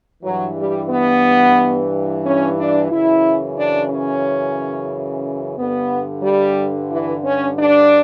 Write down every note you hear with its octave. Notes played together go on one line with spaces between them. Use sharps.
G2 E3 F#3
G3
B3
C#4
D4
F#2 C#3 E3 E4
D4
C#4
G2 D3 B3
G3
E3
C#4
D4